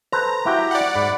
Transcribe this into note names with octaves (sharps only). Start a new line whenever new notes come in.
A4 B4 C5 A#5
E4 F#4 G4 G5
D5 F#5
G#2 B5